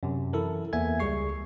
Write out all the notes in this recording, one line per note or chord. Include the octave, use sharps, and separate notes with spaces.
F#2 C3
E3 E4 A4 A#4
E2 A#3 E5 G#5 G#6
C#2 G3 G#4 C#6 C7